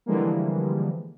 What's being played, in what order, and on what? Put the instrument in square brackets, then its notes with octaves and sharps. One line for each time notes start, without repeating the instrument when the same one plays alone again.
[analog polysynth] D3 E3 F3 G3 G#3 A#3